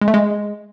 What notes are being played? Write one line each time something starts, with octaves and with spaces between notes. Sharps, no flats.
G#3
A3
G#3